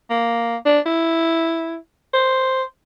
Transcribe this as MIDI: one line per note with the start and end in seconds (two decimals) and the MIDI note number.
0.10 0.56 58
0.65 0.80 62
0.86 1.75 64
2.13 2.63 72